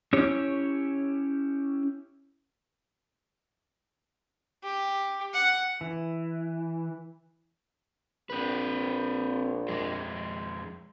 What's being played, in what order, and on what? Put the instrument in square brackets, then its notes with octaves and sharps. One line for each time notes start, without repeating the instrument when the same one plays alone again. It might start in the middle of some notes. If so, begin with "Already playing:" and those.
[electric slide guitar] C#4 E4 G4 C#5
[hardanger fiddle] G4
F#5
[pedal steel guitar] E3
[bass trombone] A#1 [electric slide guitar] C4 B4
[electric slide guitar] F2 G#3